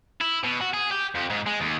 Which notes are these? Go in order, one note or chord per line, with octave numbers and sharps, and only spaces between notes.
E4
B2
F#4
G#4
G4
F2
G#2
G#3
D#2